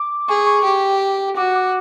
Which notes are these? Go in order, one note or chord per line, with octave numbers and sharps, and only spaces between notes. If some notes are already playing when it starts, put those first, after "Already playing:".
Already playing: D6
G#4 C#6
C#6
G4
F#4 D6
D6